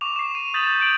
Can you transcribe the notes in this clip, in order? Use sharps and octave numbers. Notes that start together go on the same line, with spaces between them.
C#6 D6 F7
C7 E7
D#7
D#6 G6 A6 B6 F#7
G6
G6 D7 F#7